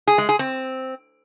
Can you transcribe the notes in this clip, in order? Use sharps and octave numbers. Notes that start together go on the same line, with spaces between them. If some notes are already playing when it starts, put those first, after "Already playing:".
G#4
G#3
G#4
C4